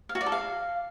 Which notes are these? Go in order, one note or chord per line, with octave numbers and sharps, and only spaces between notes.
F5
F#4
D5
A4
F5